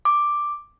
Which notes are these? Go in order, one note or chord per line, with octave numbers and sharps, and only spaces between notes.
D6